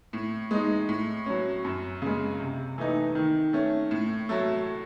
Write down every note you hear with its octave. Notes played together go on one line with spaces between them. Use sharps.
A2
G#3 D#4
A2
F#3 C#4
F#2
C#3 G#3
C3
E3 A3 D#4
D#3
A3 C#4
A2
F#3 A3